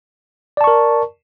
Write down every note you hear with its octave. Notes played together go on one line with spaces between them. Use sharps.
A#4 D5 A5 C#6